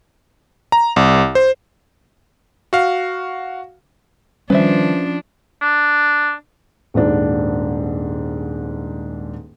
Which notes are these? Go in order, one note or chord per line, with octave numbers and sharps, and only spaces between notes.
A#5
C2
C5
F#4 F5
D#3 F3 G3 C#4 D4 B4 C5 E5
D4
D#1 G#2 D4